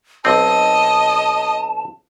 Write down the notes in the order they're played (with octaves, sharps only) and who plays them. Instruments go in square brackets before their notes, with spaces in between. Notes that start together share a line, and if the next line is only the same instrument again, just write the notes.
[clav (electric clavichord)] B1 C4 [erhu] D#5 [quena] A5